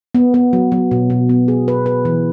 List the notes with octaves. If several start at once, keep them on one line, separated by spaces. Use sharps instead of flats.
B3
B3
F#3
F#3
B2
B2
B3
G#4
B4
B4
E3